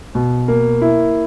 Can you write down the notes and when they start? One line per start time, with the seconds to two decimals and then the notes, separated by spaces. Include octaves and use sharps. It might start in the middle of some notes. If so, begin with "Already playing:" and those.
0.15 B2
0.48 A#3
0.82 E4